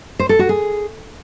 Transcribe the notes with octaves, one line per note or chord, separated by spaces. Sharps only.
C5
A4
F#4
G#4